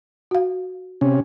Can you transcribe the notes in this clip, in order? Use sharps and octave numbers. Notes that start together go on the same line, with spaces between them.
F#4 F5
C3 C#4